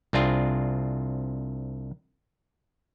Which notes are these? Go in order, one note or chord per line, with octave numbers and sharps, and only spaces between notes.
C2 C4 D4 F4 G#4